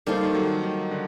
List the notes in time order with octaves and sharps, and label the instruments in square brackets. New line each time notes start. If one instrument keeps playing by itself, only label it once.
[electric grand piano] G3 [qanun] A#3 D#4 A4 C5
[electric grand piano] D#3
F#3
D#3
D3